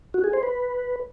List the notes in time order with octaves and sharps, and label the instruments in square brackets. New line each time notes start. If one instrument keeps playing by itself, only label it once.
[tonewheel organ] F#4
G#4
C5
B4